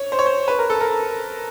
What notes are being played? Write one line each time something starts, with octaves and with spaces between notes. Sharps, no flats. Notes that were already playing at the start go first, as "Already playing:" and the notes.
Already playing: C#5
C5
C#5
C5
B4
A#4
A4
A#4